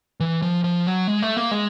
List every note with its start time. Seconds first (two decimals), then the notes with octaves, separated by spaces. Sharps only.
0.20 E3
0.42 F3
0.64 F3
0.86 F#3
1.07 G#3
1.22 A3
1.37 A#3
1.51 G#3